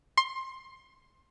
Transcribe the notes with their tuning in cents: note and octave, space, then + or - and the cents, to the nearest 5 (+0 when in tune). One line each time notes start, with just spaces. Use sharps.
C6 +20